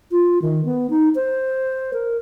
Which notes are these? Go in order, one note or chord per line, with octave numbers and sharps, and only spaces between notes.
F4
D#3
B3
D#4
C5
A#4